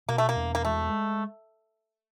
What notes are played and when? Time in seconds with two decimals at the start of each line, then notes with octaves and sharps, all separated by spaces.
0.09 B2 A#3
0.18 A3
0.29 A#3
0.36 E2
0.55 A#3
0.65 G#3 A3